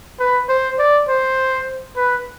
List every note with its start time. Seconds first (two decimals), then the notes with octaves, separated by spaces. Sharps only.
0.19 B4
0.49 C5
0.78 D5
1.08 C5
1.96 B4